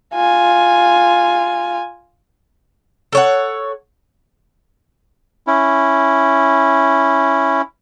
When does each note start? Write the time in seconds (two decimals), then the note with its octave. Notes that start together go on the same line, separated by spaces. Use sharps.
0.15 F4 G#5
3.13 A4 C#5 F#5
5.47 C#4 E4